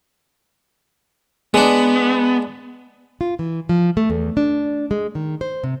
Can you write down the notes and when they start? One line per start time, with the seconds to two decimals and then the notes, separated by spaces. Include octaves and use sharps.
1.54 G#3 B3 D4
3.21 F4
3.39 E3
3.69 F3
3.97 A3
4.10 E2
4.37 D4
4.91 G#3
5.15 D#3
5.41 C5
5.64 C3